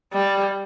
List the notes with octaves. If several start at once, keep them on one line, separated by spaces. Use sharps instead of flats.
G3